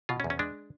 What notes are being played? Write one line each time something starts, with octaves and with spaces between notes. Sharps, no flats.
B2 F4
C#4
E2
C#4
G#3 D4